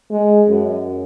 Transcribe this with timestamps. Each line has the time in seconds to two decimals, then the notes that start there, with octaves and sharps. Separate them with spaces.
0.11 G#3
0.48 F#2